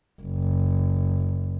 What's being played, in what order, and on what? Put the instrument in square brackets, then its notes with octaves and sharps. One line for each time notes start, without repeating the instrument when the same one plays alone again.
[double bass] F#1